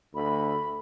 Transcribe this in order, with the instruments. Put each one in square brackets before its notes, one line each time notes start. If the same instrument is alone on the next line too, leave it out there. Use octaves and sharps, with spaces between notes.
[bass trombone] D2 [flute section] B5